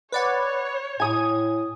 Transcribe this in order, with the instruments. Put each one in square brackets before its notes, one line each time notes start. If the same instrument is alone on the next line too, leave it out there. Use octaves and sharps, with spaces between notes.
[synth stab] B4 D5 F#5 [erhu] C#5
[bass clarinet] A2 [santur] G#5 D#6 [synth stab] G#6